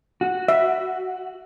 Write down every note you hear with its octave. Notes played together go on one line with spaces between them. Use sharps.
F#4
E5